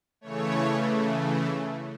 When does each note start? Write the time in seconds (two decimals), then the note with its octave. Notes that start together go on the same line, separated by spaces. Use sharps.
0.21 C#3 E3 A3 C#5